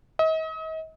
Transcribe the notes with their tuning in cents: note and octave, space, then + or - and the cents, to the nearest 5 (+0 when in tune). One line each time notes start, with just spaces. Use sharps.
D#5 +40